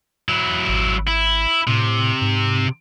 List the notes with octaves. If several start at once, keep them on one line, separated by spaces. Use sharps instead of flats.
F#3 E4
G#1
E4
A2 C3
G#2